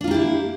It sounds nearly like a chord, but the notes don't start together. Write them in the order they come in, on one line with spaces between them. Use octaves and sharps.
D4 F4 A#3 G4 E4